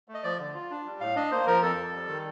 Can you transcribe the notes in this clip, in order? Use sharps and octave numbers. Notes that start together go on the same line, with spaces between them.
A3
D#5
F3 D5
D3
F4
D4
G3
A2 F5
D4 D#5
A#3 C5
F3 A#4
F2 A4
F2
G3
D#3